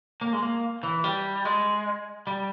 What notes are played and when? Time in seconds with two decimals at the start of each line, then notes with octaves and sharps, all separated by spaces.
0.21 A#3
0.33 G#3
0.43 A#3
0.83 E3
1.04 G3
1.45 G#3
2.27 G3